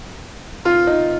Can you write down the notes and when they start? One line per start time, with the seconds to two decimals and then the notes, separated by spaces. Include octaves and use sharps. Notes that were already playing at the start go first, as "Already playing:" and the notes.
0.65 F4
0.87 D#4